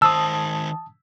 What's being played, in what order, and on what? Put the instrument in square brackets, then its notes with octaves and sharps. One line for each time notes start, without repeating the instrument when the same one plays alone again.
[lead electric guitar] D#3 C5 [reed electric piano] A5 D#6 [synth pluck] E6